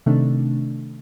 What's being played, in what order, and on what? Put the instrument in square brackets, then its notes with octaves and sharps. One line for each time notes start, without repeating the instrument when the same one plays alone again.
[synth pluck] C3 D#3 A3 D4